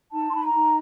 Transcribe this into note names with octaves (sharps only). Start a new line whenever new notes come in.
D#4 A5
C6
D#4 B5
A#5
D#4